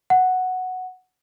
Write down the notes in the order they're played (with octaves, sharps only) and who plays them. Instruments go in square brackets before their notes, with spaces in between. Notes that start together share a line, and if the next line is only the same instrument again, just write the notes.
[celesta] F#5